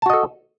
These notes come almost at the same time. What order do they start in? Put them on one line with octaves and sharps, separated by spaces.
A5 F#4 D#5 A4